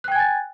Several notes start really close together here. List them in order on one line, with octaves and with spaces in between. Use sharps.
F#6 G5 G#6 G#5 A6